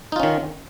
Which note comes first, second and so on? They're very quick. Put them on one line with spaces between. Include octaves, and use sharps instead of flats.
D#4 F4 C#4 D#3